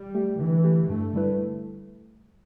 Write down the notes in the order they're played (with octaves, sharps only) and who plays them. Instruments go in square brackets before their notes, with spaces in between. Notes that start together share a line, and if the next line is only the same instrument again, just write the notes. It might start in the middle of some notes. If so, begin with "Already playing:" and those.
Already playing: [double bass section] G3
[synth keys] A3 G4
[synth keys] D3 [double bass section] E3
[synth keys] A3 G4
[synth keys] G2 [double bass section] A3
[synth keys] D3 G3 E4 B4